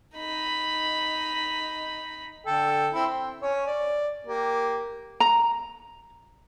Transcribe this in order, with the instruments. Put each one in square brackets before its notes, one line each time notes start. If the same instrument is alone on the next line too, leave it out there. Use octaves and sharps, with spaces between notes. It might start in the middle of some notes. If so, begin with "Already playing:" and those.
[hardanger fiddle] D#4 B5
[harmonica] D3 A4 G5
C4 E4
C4
C#4 C#5
D5
A#3 G4
[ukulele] A#5